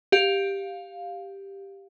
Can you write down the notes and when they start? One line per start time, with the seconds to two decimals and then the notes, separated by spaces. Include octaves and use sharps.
0.12 G4 F5